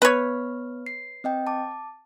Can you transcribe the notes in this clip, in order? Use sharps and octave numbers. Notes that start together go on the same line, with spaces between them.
B3 B4 C#5 F6
C7
C4 D#5 G5
A5 D6